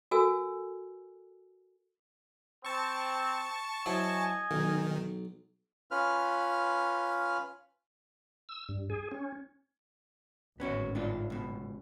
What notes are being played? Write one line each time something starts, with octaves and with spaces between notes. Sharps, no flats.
F#4 A4 A#4 G#5 E6
C4 A5 C#6
F#3 E4 C5 D#5 G#5
B1 D#3
C#4 F4 B4 F6
E6
G2
G#4
C#4
G#1 D2 A2 B3 C#4 F#4
G#2 D4 F4
C#2 B2